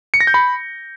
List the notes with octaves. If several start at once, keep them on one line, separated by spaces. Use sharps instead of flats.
C#7
A#6
G6
B5